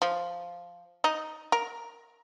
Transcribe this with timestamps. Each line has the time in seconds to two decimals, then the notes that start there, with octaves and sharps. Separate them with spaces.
0.02 F3
1.04 D#4
1.52 A#4